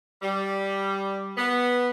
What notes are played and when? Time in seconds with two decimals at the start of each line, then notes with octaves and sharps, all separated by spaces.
0.22 G3
1.37 B3